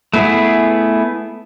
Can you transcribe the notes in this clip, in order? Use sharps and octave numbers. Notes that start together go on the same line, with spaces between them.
A3 B3 E4 G#4